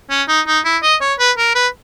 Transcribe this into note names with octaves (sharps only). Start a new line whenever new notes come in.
C#4
D#4
D#4
E4
D#5
C#5
B4
A#4
B4